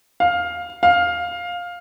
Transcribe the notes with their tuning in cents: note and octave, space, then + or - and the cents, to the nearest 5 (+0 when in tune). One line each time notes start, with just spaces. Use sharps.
F5 +10
F5 +10